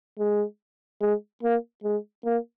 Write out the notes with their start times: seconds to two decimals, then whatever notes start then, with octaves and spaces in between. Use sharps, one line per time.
0.19 G#3
1.01 G#3
1.43 A#3
1.84 G#3
2.25 A#3